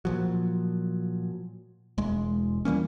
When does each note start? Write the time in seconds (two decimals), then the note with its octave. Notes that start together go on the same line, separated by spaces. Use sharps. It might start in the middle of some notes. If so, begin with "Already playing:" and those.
0.05 A#2 F3 F#3
1.98 E1 G#3
2.65 E3 G3 A#3 C#4